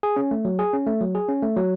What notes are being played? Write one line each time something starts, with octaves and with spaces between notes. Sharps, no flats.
G#4
C#4
A3
F#3
G#4
C#4
A3
F#3
G#4
C#4
A3
F#3